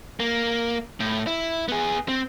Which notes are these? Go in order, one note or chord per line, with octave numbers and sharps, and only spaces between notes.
A#3
A2
E4
B3 G#4
C4